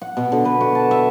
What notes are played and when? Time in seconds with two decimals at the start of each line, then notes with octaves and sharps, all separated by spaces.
0.02 F#5
0.17 B2
0.32 D3
0.45 B4
0.61 F#4
0.75 A5
0.91 E5